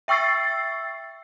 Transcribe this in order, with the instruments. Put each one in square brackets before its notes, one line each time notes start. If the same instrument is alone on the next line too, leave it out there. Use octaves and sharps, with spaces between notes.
[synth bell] E5 G5 C#6 E6 A6 C7